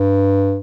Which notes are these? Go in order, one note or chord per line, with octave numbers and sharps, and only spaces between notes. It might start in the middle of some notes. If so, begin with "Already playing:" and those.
Already playing: G2